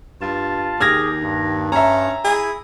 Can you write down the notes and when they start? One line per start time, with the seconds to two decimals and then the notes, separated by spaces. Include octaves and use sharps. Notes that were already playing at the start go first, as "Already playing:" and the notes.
0.21 G2 F4 A5
0.81 D#2 G4 G#4 F6 G#6 A#6
1.22 G2
1.72 C#4 E5 A#5
2.24 E4 G#4